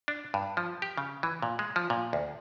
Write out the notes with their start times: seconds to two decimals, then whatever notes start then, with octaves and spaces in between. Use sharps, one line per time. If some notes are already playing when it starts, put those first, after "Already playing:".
0.08 D4
0.34 G2
0.57 F3
0.82 G4
0.98 C#3
1.23 E3
1.42 A#2
1.59 G#3
1.76 F3
1.90 A#2
2.13 D2